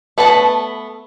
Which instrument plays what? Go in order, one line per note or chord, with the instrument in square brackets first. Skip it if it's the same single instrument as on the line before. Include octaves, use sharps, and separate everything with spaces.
[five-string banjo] A3 B3 B4 A5